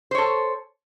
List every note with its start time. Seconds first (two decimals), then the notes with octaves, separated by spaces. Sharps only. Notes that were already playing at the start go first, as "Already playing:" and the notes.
0.11 C5
0.15 C#5
0.18 A4